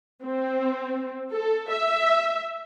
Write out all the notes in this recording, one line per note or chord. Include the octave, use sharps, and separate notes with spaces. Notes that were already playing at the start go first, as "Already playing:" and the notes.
C4
A4
E5